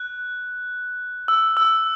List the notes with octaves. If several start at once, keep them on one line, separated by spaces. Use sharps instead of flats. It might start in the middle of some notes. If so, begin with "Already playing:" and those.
Already playing: F#6
E6
E6